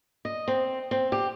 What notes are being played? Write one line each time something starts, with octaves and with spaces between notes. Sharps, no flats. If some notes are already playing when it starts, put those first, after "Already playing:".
D#5
C4
C4
G4